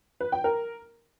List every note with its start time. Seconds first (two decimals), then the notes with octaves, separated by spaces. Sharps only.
0.20 B4
0.32 G5
0.44 A#4